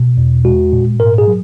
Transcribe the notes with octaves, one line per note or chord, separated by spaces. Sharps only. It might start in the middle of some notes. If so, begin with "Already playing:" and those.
Already playing: B2
E2
G#3 F#4
A#2
G#2 A#4
G#4
F#3